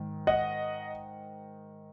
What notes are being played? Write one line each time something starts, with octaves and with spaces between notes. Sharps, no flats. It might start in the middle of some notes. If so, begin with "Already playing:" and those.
Already playing: G#2 D#3
D#5 F#5